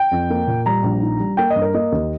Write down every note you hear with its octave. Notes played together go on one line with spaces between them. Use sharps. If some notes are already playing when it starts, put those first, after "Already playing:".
Already playing: G5
F2
A#3
A#2
G3 A#5
A#1
D#4
G3
A#3 G5
G2 D#5
A#4
A#3 D#5
D#2